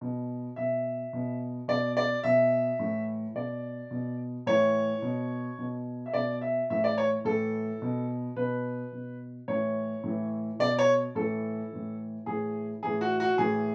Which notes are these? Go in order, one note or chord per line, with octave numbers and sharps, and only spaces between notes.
B2
B2 E5
B2
B2 D5
D5
B2 E5
A2 E3
B2 D5
B2
A2 E3 C#5
B2
B2
E5
B2 D5
E5
A2 E3 E5
D5
C#5
A2 E3 A4
B2
B2 B4
B2
A2 E3 C#5
A2 E3
B2 D5
C#5
A2 E3 A4
A2 E3
A2 E3 G#4
A2 E3 G#4
F#4
F#4
A2 E3 G#4